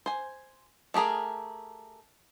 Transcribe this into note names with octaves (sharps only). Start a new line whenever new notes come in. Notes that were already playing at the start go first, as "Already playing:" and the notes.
C5 G#5
A3 G4 G#4 A#4 G#5